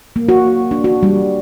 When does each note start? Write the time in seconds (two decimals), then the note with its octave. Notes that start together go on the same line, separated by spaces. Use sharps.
0.16 A#3
0.29 F#4
0.71 D4
0.84 F#4
1.03 G3